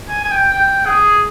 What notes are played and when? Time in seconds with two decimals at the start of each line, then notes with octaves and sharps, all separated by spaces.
0.09 G#5
0.25 G#5
0.31 G5
0.52 G5
0.85 G#4